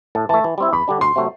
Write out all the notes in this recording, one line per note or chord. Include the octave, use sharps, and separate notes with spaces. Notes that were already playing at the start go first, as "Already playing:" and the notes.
A2 A5
E3 A3 A5
E3
G3 C4 E4
E2 B5
D3 G3 D4
D2 C6
C3 F#3 A3